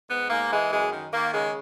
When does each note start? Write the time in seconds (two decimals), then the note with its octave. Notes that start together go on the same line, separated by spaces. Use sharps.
0.09 G#2 B3
0.30 G#2 A#3
0.50 E3 G#3
0.71 F#2 G#3
0.91 D#3
1.11 D#3 A#3
1.32 C#3 G#3